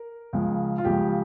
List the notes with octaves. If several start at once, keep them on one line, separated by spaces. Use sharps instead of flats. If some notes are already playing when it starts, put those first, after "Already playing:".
Already playing: A#4
C#2 C#3 F3
F4
C#2 C#3 F3 G4